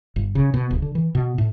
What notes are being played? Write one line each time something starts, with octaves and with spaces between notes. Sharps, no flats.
G1
C#3
B2
D1
D3
E3
B2
A2